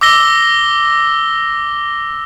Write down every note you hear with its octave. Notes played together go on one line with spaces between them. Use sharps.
D6 E6 A#6 G7